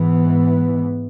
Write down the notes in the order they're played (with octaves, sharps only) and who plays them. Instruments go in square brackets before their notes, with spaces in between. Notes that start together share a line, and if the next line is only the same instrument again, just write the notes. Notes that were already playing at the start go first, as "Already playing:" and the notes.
Already playing: [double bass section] G#2 E3 B3